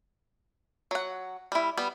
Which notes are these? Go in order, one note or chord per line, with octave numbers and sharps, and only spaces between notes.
F#3 F#5
G3 E4
G3 B3